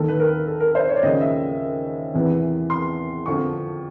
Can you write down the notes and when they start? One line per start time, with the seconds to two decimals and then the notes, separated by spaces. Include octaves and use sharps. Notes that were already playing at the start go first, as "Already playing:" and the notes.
Already playing: D#2 D#3 A4
0.08 B4
0.20 A#4
0.47 A4
0.60 A#4
0.75 C5
0.89 C#5
0.96 D5
1.03 D#2 C#3 F3 D#5
1.21 E5
2.14 E2 C3 E3
2.70 C6
3.26 F2 D3 F3 C#6